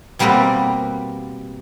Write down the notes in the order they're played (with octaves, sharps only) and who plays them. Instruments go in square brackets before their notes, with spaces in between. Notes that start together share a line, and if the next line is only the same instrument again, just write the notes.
[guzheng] B2 G3 A#3 C4 A#4 B4